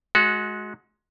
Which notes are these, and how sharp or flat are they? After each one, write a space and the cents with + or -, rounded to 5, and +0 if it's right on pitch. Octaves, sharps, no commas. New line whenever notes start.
G#3 +20 F#4 -15